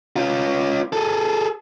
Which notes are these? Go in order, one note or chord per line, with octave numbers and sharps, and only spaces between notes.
C#4 F4
G#4 A4